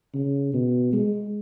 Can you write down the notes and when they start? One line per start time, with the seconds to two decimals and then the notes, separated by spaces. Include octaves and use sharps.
0.14 C#3
0.54 B2
0.93 G#3